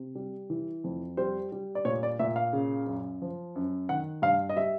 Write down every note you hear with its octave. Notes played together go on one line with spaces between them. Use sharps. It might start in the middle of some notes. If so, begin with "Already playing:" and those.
Already playing: C3
G3
E3
F2
G3 C5
G3
D5
A#2 C#5
D5
A#2 E5
F5
C#3
F#2
F3
F#2
D#3 F#5
G2 F5
D#5
G3 E5